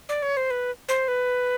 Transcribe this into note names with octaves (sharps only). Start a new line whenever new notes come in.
D5
C#5
C5
B4
C5
B4